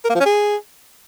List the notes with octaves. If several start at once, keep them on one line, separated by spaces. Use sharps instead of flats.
A#4
A#3
F3
C#4
G#4